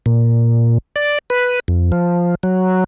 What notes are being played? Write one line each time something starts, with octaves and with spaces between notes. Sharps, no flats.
A#2
D5
B4
F2
F3
F#3